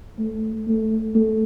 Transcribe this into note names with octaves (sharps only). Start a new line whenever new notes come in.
A3
A3
A3